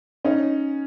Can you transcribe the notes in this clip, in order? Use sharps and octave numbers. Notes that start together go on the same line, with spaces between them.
C#4 D#4